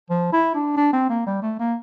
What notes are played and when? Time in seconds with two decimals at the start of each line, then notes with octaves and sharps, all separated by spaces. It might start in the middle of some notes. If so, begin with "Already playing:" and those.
0.10 F3
0.33 E4
0.55 D4
0.77 D4
0.93 C4
1.10 A#3
1.26 G3
1.43 A3
1.59 A#3